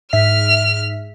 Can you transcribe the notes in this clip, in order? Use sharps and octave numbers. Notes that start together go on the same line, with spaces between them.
G#2 E5 F6 B6